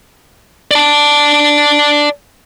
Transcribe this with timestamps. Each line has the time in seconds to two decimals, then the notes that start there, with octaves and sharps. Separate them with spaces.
0.71 D5 A5